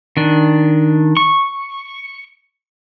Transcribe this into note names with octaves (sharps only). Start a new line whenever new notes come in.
D#3 D4
C#6